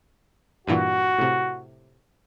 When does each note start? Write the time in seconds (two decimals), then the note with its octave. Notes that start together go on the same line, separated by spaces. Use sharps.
0.67 G2 A#2 E3 F#4
1.19 A2 C3